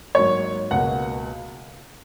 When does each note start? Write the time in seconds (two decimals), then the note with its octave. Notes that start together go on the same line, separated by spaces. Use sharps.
0.15 G#2 F#3 A#3 C#5
0.71 C#2 B2 A#3 F#5